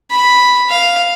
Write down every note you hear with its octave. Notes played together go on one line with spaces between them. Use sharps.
B5
F5